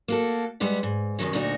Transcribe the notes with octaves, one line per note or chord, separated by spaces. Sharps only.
A#3 F#4 A4
G3 G#3 G4 B4 F#5
G#2
F#2 C3 D#3 F#3
D2 A#2 D4 D#4 F#4